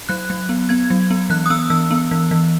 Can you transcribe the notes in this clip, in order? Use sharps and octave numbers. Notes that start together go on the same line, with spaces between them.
F#3 F#6
F#3
B3
B3 G#6
F#3
B3
E3 F#6
D#6
B3 E6
E3 E6
B3
E3
E3